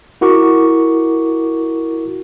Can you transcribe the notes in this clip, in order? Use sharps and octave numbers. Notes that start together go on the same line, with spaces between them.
E4 F#4 A#4 C#6 D6